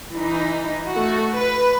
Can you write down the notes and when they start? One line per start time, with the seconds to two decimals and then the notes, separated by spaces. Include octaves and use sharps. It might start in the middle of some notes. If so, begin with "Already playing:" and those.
0.13 E3 D#4
0.93 A3 F#4
1.34 B4